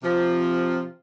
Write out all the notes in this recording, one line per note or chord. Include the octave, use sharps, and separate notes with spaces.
C3 F3